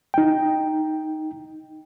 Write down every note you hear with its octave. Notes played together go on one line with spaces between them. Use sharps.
D#4 G5